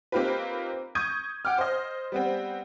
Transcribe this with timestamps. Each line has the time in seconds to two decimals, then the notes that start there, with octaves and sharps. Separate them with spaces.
0.12 A#3 C4 D#4 F4 G4 B4
0.95 C#6 D#6 G6 G#6 D#7
1.45 F#5 G5 D6 F6
1.58 C5 D#5
2.12 G3 B3 C4